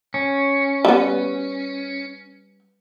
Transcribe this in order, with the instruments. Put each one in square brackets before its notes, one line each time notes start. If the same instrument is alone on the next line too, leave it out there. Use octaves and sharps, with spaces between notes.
[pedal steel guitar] C#4
[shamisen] G3 B3